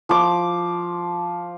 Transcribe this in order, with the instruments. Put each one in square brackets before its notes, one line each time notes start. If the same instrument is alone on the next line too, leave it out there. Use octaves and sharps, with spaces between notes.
[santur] F3 D6